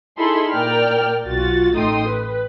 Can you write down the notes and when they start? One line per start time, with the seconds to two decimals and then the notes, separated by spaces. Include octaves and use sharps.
0.18 D#4 E4 G#4 A4 B5 C6
0.52 A#2 A#4 D5 G5 F6
1.25 B1 F4 F#4 A6
1.76 A1 A3 D#4 G5 C6 D#6
2.09 B4